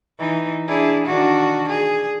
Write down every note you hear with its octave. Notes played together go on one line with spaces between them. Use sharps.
E3 D#4
D4 E4 G#4
D#3 D4 F#4
G#4